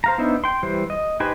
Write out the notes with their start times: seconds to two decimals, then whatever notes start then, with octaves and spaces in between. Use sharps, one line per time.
0.04 C5 F5 A#5
0.18 B3 D4 D#4 C5 E5
0.44 G5 C6
0.63 E3 G3 C5
0.90 D#5
1.20 D#4 G4 B4 C5 G#5